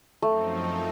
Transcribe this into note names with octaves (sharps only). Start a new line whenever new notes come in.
F#2 F3 A3 C4 D#4